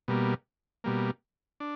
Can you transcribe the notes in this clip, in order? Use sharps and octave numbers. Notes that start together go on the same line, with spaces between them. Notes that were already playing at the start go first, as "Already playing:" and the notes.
B2 G3 A#3
B2 G3 A#3
D4